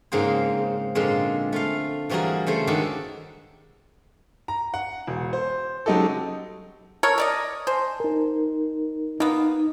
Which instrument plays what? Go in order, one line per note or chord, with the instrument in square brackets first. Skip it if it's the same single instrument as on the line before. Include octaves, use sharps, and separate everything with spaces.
[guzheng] G#2 C#3 A#3 C4 G#4 C5
A#2 D3 F3 G#3 C4
A3 F4 F5
E3 F3 G3 F#4 G#4 A#4
C#3 A3 C5 C#5
D#3 G#3 D4 F#4 G4 A4
[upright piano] A#5
F#5
E1
C5
C#3 F#3 G#3 D#4 G4 A4
[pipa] A4 A#4 C#5
A#4 D5 D#5
[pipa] C5 [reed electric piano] G#5 A5
[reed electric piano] D#4 A#4
[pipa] A#3 B3 [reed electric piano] D#4